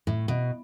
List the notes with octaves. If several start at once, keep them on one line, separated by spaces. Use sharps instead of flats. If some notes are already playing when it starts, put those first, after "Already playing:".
A2
B2